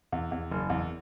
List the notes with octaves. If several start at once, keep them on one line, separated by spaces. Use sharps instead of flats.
E2
E2
F#1
E2